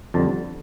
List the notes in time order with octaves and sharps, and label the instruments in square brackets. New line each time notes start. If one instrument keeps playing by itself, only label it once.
[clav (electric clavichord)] F2 D3 G3 A5